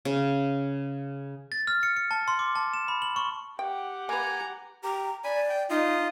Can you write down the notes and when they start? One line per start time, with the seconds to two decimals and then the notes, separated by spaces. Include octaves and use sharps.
0.05 C#3
1.52 A6
1.67 F6
1.83 C#7
1.96 C#7
2.11 A5
2.28 C6
2.39 D6
2.55 A5
2.74 E7
2.88 B5
3.02 F#7
3.16 C#6
3.59 G4 F#5 G5
4.09 A#3 B4 G#5 A#5
4.84 G4 A#5
5.24 D5 G#5 B5
5.49 G5
5.70 D#4 F4 D#5